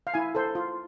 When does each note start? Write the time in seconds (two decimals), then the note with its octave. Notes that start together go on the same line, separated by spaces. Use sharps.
0.07 F5
0.14 E4 G#5
0.35 A4 C5
0.55 F4